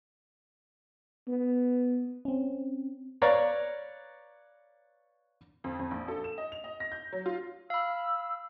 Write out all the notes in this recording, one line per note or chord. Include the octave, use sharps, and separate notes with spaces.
B3
C4 C#4
B4 C#5 D5 F5 A#5 C#6
F2
F2
A#1
A4
E7
D#5
F7
D#5
A#6
G6
F#3
F4
F5 B5 E6